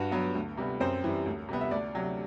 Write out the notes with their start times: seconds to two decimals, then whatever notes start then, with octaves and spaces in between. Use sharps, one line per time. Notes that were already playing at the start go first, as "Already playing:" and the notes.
Already playing: G2 F#4
0.12 F#3 B3
0.35 D2
0.57 C3 G3 B3
0.80 F#2 C4 C5
1.04 E3 G3
1.26 D2
1.48 C3 G3 B3
1.61 E5
1.71 D2 D4 D5
1.95 C3 F#3